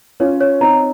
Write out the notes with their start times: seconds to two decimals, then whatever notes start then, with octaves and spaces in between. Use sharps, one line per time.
0.20 C#4 F4 C#5
0.41 C#5
0.61 C4 D#4 A#5